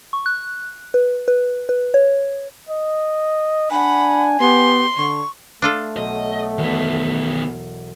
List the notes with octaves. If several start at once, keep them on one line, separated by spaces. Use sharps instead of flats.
C#6
F#6
B4
B4
B4
C#5
D#5
D4 F#5 G#5 B5
B3 G4 C6
D3 C#6
A3 D4 F4 A4
B1 D#5
E1 D#3 B3